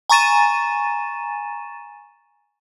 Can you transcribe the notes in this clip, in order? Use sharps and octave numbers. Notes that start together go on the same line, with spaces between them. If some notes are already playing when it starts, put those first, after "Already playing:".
G#5 A#5 C#6 A6 D#7 E7